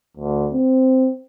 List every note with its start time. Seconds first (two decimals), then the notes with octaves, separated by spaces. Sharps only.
0.17 D2
0.53 C4